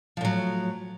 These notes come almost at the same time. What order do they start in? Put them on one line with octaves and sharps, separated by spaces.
F3 A2 F#3